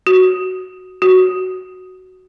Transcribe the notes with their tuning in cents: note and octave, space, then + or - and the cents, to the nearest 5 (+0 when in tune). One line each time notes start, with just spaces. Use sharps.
F#4 +5
F#4 +5